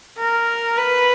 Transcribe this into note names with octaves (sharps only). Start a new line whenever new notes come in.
A#4
B4